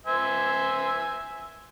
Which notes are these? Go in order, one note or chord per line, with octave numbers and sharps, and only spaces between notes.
C5 E5 G#5